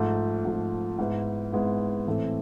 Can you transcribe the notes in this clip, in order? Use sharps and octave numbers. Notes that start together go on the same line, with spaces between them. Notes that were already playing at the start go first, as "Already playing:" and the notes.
Already playing: G#2 F3 A3
G#2 F3 A3
G#2 G#3 B3 E4
G#2 G#3 B3 E4
A2 E3 A3 C4